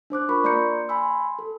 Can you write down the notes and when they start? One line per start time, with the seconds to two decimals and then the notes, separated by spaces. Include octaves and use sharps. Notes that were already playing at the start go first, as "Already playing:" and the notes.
0.10 D4 C5 D6 F#6
0.29 F4 A#4 B5 C#6
0.44 A#3 D5 A#5 C6 G6 C#7
0.89 G#5 B5 C6 E6
1.39 A4